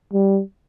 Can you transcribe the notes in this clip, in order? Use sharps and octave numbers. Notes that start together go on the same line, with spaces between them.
G3